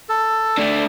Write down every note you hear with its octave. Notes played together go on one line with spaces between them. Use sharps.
A4
A3 D4